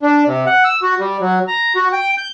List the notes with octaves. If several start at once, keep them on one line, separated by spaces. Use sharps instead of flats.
D4
C3
F#5
E6
F#4
G3
F#3
A#5
F#4
G5
G6